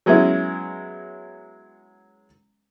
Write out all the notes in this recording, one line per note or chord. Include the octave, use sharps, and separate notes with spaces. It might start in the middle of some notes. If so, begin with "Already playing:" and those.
F#3 G#3 B3 C#4 E4